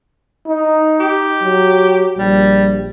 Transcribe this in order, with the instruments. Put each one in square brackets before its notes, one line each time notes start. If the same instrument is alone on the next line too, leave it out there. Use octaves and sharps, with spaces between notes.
[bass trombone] D#4
[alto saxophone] G4
[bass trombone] F#3
[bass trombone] A#1 [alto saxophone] G3